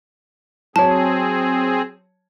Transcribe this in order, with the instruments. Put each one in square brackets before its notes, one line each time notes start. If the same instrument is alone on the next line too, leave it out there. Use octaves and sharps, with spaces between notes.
[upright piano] F#3 C#5 [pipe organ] C4 G#4 [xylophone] A5